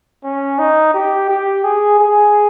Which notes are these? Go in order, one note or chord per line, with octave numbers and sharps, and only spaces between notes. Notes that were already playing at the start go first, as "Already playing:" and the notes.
C#4
D#4
G4
G4
G#4
G#4